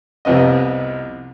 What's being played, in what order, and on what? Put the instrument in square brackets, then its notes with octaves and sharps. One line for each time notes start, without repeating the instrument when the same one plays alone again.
[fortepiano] C2 F2 C3 B3 D#5